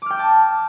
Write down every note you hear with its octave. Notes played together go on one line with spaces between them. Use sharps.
G5 A5 D6 E6 F6